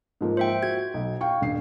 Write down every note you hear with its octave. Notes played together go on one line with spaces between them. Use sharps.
G#2 F3 A#3
C5 E5 G5
F#4 G#6
B1
F5 G5 C#6
D#1 G2 C7